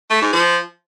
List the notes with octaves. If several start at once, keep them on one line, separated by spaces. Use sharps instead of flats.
A3
G#2
F3